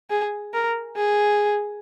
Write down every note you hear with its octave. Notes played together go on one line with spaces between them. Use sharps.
G#4
A#4
G#4